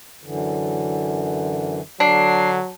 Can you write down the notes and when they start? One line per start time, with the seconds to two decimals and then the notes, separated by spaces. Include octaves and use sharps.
0.24 F#2 D3 E3
2.00 D3 F#3 D4 C7